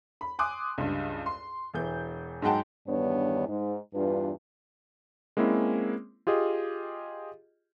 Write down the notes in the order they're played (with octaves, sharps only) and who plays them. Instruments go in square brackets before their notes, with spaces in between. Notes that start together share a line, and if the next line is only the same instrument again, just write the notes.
[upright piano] B5
G#5 C6 D6 D#6 F#6
C#2 G2
C6
E1 E3 G6
G#2 F#3 G#3 F#5 G5 A5
[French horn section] E2 G2 D#3 B3 D4 C#5
G#2
E2 G2 D4 F4 B4
[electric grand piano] G#3 A#3 C4 C#4 E4
F4 G4 G#4 D#5